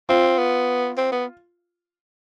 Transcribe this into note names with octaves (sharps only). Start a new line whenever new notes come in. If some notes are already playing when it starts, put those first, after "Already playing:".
C4 F4
B3
C4
B3